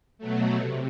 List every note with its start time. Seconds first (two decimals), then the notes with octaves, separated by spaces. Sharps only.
0.18 B2 F#3 A3
0.59 C3